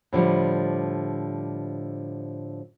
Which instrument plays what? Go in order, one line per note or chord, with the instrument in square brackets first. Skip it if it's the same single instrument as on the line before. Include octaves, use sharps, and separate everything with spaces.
[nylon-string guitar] A2 D3 F3 G3